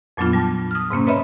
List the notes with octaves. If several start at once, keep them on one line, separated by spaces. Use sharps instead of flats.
F2 A#2 F#3 B3 D4 F4
G3 A5
D#6 F6
G#2 C3 A#3 C#4
B4 C#5 D#5 E5 B5